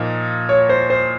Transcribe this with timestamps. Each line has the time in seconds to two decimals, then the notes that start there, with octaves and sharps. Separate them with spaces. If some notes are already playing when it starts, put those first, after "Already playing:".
Already playing: A#2 F3 A#3 D#4
0.49 C#5
0.69 C5
0.90 C5